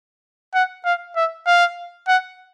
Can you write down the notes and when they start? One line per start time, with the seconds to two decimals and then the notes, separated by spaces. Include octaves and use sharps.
0.54 F#5
0.85 F5
1.16 E5
1.46 F5
2.08 F#5